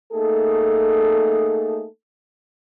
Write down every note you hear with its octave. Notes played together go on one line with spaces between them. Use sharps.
A3 A#3 D#4 G#4 A4